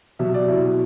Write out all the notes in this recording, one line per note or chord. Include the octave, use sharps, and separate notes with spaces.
B2 F#3 E5
D5
B2 F#3 E4